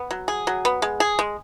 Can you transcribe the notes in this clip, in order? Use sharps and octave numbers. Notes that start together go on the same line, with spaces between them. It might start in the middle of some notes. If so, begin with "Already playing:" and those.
Already playing: B3
F#3
G#4
F#3
B3
G#3
G#4
G#3